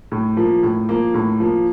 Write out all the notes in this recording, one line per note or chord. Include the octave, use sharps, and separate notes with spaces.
A2
F3 A#3
A2
F3 A#3
A2
F3 A#3